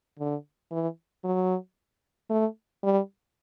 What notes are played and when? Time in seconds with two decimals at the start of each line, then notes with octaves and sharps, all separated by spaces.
0.19 D3
0.72 E3
1.24 F#3
2.30 A3
2.83 G3